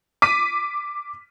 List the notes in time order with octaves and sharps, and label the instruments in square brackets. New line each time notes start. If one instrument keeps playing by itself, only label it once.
[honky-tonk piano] D6 B6 D#7